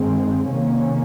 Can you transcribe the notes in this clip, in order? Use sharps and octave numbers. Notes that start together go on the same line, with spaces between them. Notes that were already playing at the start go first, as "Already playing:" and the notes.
Already playing: G2 D#3 G#3 C4
C3 D#3 A#3 C#4